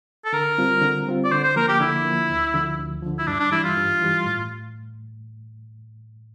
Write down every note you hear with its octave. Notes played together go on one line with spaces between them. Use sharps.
A4
D3 A#4
G3 C4 F4
D3
G3 C4 F4
D5
D3 C5
C5
F3 A#3 A#4
G4
D3 E4
F3 A#3
D2
D3 F3
D2
D3 F3
E4
G2 D4
D4
E3 G3 E4
F4
G2
E3 G3
A2